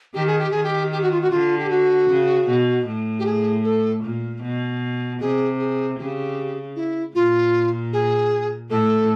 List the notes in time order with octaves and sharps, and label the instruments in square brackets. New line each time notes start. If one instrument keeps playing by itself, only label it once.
[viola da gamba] D#3 [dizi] G4
[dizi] G#4
G4
[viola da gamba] D#3 [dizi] G#4
[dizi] G4
G4
F#4
F4
F#4
[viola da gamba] D3 [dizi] F4
[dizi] G4
F#4
[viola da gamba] C#3
B2
A2
[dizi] G4
G#4
A4
[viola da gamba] A#2
B2
[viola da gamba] C3 [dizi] G#4
[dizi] G#4
[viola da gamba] C#3 [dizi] G4
[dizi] E4
[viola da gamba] A#2 [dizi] F4
[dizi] G#4
[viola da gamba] A2 [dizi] A4